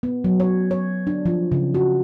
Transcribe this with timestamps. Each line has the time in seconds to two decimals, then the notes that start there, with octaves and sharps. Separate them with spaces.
0.03 B3
0.24 F#3
0.40 C#5
0.71 C#5
1.07 D4
1.26 F3
1.52 C#3
1.74 F#4